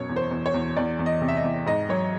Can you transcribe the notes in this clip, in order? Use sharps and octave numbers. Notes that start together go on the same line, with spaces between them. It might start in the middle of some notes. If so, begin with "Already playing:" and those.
Already playing: F#2 B2 C#5
E2
C5
E2
C#5
E2
E2 D5
E2
D#5
C3
E5
D#5
E2
G#2 D#5
F#3 C#5